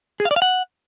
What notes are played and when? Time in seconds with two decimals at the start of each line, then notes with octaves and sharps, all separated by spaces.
0.20 G#4
0.25 F5
0.31 D5
0.36 F5
0.42 F#5